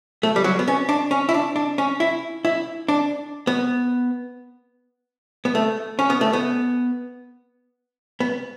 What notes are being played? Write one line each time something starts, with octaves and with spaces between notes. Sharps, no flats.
A3
G3
F#3
B3
C#4
D4
C#4
E4
D4
D4
C#4
E4
E4
D4
B3
B3
A3
C#4
B3
A3
B3
B3